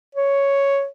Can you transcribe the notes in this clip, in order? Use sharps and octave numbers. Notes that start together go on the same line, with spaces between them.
C#5